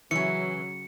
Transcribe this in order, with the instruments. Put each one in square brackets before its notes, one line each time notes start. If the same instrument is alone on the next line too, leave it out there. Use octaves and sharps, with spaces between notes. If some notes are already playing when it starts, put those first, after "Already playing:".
[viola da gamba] C#3 F#3 [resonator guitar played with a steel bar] E3 C#4 [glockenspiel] C#7